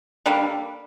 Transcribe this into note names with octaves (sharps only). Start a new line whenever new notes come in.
D3 G3 A#3